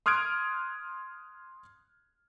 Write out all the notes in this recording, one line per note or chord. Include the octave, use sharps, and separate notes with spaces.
C6 D#6 F6 F#6 G#6 D7